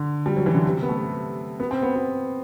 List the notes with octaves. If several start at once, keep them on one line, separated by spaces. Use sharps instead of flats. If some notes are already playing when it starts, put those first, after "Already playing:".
Already playing: D3
G3
F#3
E3
D3
C3
B3
A3
B3
C4
B3
B3